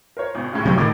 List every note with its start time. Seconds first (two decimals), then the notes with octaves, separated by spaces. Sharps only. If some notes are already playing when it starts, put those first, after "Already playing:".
0.17 A#4 C5 C#5
0.35 G#1 B2
0.53 D#2 A2 C#3
0.65 C3 F#3
0.78 A2 D#3 D6